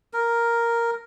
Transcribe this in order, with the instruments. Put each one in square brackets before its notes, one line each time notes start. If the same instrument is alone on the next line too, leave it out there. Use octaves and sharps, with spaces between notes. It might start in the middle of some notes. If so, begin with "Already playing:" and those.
[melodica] A#4